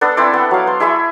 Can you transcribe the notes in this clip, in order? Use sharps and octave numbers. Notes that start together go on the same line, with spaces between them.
B3 D4 A4
C4 E4 C5 D5
B3
F#3 F5
C5
E4 G#4 E5 C#6